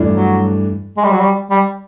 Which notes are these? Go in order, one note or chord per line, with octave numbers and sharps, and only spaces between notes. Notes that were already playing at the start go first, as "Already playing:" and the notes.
Already playing: G2 E3 A3 D4
F#3
G#3
G3
F#3
G3
G3